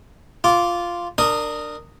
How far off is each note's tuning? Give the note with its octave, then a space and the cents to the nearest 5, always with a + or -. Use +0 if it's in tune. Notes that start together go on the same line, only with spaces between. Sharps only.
F4 +0 D6 -15
D4 +20 A#4 -15 D#6 +0